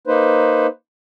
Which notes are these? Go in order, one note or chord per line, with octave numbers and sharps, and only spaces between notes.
A#3 D#4 B4 C5